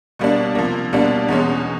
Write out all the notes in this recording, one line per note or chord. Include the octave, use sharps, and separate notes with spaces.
B2 G3 A#3 D4
C3 F3 A#3
B2 G3 A#3 D4
E2 B2 G#3 C#4